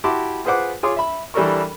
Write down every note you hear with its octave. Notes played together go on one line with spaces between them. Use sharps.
E4 F#4 G4 A5 C6 D6
F4 G#4 B4 C5 F#5 D6
F4 G#4 C#5 C6 D6
E5 B5
E3 G3 D4 A4 A#4 C#6